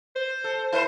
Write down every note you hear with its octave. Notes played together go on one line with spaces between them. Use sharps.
C5
A4
E4 B4 C5